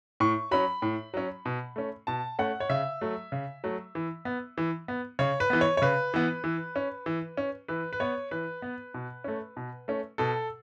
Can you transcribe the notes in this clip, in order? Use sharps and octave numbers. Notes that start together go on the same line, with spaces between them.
A2 C#6
F#3 C#4 B5
A2
F#3 C#4
B2
A3 C#4
B2 A5
A3 C#4 F#5
C#5
C#3 E5
F#3 A3
C#3
F#3 A3
E3
B3
E3
B3
C#3 C#5
B4
E3 B3
C#5
C#5
C#3 B4
E3 B3
E3
C#4
E3
C#4
E3 B4
B4
B3 C#5
E3 B4
B3
B2
A3 C#4
B2
A3 C#4
B2 A4